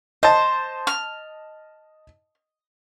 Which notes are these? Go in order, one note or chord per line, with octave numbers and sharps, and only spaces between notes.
C5 D#5 A5
F6